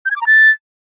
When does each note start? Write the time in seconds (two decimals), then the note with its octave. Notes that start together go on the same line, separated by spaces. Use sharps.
0.05 G6
0.11 G#6
0.16 D6
0.21 A#5
0.27 A6